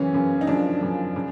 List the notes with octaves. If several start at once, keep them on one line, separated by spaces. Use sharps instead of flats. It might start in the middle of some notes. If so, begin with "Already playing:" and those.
Already playing: F#2 C#3 E3 C#4
F#2 C#3 E3
D#4
F#2 C#3 F3 D4
F#2 C#3 F3
C#3